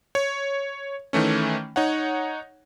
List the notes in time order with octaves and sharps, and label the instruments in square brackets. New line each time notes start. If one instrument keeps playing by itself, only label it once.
[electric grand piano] C#5
D#3 E3 A3 C#4
D#4 C#5 F#5